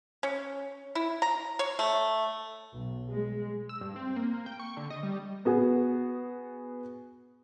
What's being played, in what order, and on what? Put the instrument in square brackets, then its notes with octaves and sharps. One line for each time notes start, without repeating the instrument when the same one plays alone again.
[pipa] C#4
E4
A#5
C#5
A3
[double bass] B1
G#3
[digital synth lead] E6
G2
C4
A#3
G5
C#6
D3
D#5
G3
[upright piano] B3 F#4 G#4